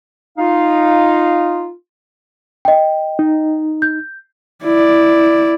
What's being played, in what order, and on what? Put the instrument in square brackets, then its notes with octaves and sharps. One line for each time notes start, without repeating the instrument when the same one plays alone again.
[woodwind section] D#4 F4 F5
[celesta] D#5 G5
[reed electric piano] D#4
[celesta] G6
[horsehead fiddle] E4 D5